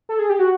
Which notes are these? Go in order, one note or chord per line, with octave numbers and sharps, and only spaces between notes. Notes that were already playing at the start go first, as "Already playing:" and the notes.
A4
G#4
G4
F#4